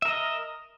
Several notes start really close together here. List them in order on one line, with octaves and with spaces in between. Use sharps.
E5 A#4 D#5